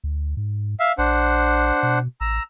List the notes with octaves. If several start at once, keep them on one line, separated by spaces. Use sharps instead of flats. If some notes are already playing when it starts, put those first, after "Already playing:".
D2
G#2
E5 F5
A#1 D4 C5 F#5
B2
A1 A#5 E6